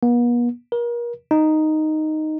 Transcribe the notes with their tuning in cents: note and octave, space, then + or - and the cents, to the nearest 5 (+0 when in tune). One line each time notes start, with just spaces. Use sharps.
B3 -45
A#4 +35
D#4 -5